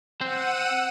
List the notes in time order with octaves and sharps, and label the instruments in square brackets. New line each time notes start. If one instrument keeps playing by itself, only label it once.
[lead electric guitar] C4 C5 [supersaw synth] F#5 E6 D#7